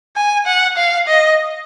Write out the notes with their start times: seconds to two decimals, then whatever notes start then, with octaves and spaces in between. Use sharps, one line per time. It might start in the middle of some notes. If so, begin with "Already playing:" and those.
0.16 G#5
0.46 F#5
0.77 F5
1.07 D#5